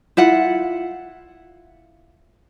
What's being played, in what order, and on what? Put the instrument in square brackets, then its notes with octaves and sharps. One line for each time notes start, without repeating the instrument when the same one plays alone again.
[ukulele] E4 F4 F#5